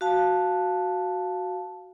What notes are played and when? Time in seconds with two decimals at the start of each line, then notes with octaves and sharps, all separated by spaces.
0.01 F#4 F5 A5